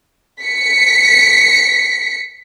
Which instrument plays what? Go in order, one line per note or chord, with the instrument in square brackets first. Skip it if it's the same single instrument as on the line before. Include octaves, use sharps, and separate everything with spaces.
[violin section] B6 C#7